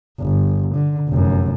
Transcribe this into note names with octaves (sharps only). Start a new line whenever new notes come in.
G1
D3
F1 F#2